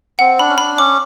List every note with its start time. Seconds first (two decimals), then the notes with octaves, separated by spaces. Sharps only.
0.19 C4 F#5
0.39 D4 B5
0.49 C#4
0.58 D4 B5
0.77 C#4 D6